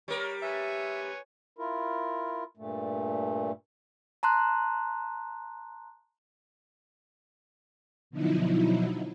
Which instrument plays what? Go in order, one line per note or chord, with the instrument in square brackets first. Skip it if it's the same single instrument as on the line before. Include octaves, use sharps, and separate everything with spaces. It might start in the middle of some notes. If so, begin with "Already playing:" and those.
[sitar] G3 A#4 [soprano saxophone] C#5
[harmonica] B4 C#5 G#5 [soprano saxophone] E5
[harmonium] E4 F4 A#4
G2 A#2 A3
[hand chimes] A5 A#5 C6 F#6
[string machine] B2 D3 F3 F#3 D#4 E4